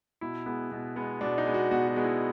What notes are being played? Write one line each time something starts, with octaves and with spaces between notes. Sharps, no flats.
B2 E4
G#3 B3
B2
G#3 B3
B2 D4
D#4
G#3 B3
F#4
B2 F#4
F#4
G#3 B3
E4